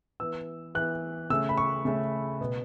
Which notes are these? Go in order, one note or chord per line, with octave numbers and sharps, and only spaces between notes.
E3 B3 E6
E3 B3 F#6
C#3 A3 C#4 E6
B5
C#6
C#3 A3 C#4
B2 B3